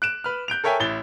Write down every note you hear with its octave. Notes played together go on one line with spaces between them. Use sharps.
F#6 D7 E7
B4 F6
F#6 G6 D7 F7
A4 A#4 C#5 E5 G5 G#5
A1 E4 A6 G7